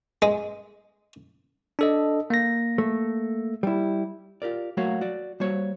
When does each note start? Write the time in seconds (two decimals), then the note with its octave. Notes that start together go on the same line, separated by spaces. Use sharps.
0.22 G#3
1.79 D4 A4 D#5
2.30 A#3 A#6
2.78 A3
3.63 G3 E4
4.42 F4 G4 A#4 D5
4.77 F#3 A3 A#3 F#4 C#5 F5
5.01 F#4 D5
5.40 G3 A#3 F#4 C5 C#5